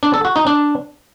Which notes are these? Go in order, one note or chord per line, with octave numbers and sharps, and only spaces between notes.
D4
A4
F#4
D#4
D4